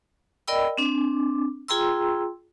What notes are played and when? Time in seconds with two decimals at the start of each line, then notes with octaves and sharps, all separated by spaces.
0.48 A#4 D5 D#5 G5 B5 E6
0.77 C4 D4 D6
1.68 F4 G#4 G5 A#5 C6 E6